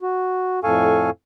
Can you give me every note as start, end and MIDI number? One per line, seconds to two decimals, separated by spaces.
0.01 0.60 66
0.64 1.10 41
0.64 1.10 45
0.64 1.10 69
0.64 1.10 77
0.64 1.10 80
0.64 1.10 85